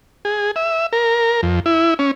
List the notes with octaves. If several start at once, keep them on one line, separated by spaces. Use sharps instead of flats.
G#4
E5
A#4
F2
E4
C#4